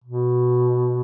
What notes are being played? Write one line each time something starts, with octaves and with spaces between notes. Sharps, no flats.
B2